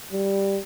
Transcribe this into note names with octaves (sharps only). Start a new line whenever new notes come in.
G3